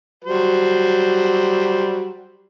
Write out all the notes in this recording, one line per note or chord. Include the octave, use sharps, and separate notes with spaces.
F#3 G3 C5